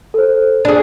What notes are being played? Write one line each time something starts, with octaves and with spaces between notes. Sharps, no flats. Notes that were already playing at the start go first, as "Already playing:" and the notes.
A4 C5
D4 G#4